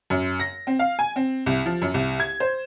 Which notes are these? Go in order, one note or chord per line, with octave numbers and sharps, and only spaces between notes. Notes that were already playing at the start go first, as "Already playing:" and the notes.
F#2
A#6
C4
F5
G#5
C4
C2
F3
F#2
C2
G#6
C5